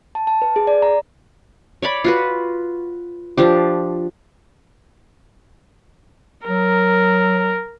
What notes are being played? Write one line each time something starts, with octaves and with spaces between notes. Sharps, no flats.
A5
A5
B4
G#4
D5
A#5
C#5 D5 B5
F4 F#4 B4
F3 D4 G4
F#3 A#4